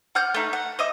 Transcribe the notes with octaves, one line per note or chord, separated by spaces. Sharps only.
F#5 F6 G6
A3 D#4
F#5
D#5 E5 D#6